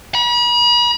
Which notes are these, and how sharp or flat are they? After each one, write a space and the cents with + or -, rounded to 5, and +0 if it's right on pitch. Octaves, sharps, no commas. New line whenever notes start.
B5 -45